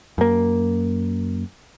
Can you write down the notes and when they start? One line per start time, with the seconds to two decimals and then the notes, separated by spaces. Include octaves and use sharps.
0.18 F#2 A#3